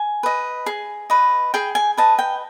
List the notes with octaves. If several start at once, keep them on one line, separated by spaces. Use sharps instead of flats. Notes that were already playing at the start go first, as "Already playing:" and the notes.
Already playing: G#5
B4 D#5
G#4
B4 D#5
G#4 G5
G#5
B4 D#5 A5
G5